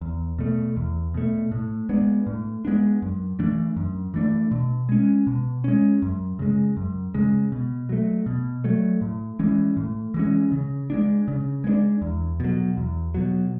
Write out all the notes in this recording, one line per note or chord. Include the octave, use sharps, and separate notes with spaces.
E2
B2 A3
E2
B2 A3
A2
G#3 B3 D4
A2
G#3 B3 D4
F#2
E3 A3 D4
F#2
E3 A3 D4
B2
G#3 C#4
B2
G#3 C#4
F#2
C#3 G#3
F#2
C#3 G#3
B2
F#3 A3
B2
F#3 A3
A2
E3 G#3 C#4
A2
E3 G#3 C#4
C#3
G#3 B3 D4
C#3
G#3 B3 D4
E2
B2 F#3
E2
B2 F#3